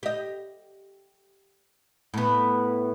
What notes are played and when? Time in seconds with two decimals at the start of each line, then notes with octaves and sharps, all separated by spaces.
0.03 G4 D#5
2.14 A2 B3